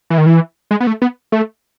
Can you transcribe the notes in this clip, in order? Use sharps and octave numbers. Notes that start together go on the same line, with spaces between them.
E3
D#3
E3
G#3
B3
A3
B3
A3